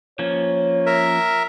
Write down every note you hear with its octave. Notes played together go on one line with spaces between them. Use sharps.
F3 A#3 C#4 C#5
A#4 E5